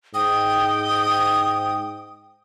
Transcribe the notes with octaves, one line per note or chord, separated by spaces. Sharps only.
G#2 G5 D#6